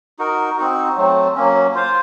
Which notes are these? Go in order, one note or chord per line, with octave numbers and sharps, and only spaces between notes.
D#4 F#4 A#4
C4 D#4 F#4
F#3 A3 C4
F#3 A#3 C#4
F4 C5 F5